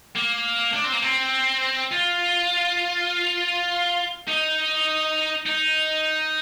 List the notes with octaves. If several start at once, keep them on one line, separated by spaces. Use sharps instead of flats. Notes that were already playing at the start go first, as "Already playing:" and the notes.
A#3
D4
C4
A#3
C4
F4
D#4
D#4